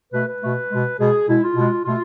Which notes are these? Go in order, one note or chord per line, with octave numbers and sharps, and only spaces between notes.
B2 A3 B4
B4
B2 A3
B2 G#3
B2 G#3 G#4
B2 G#3 E4
F4
B2 G#3
B2 A3 F4